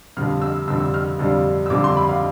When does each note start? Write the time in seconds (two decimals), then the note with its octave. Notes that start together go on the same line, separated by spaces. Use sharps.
0.17 F2 D3 G3 F6
0.42 E6
0.68 F2 D3 G3 E6
0.80 E6
0.94 F6
1.19 F2 D3 G3
1.66 E6
1.70 F2 D3 G3 D6
1.84 C6
1.97 B5
2.09 F5